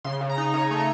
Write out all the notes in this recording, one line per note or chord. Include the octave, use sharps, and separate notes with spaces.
C#3 C6
C#3
A#5
D#4
C#3 C#5
A3
C#5